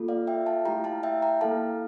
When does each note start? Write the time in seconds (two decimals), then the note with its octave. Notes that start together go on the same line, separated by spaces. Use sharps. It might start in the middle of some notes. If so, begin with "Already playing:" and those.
Already playing: A#3 F4 A4
0.08 D5 F5
0.27 E5 G5
0.46 F5 A5
0.66 A3 E4 G4 G5 A#5
0.84 F5 A5
1.03 E5 G5
1.22 G5 A#5
1.41 A#3 E4 A4 F5 A5